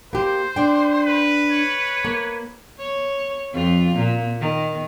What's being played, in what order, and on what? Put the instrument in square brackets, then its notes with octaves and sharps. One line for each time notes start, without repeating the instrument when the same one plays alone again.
[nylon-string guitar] A#3 G4 [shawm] C5
[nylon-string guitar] D4 G5
[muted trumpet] B4
[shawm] C#5
[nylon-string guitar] A#3
[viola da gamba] C#5
F2 C4 F4
A#2
D#3